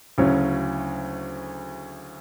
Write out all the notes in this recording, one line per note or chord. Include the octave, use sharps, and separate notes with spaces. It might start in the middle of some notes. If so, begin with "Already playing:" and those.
D2 C#3 F#3 C#4 E4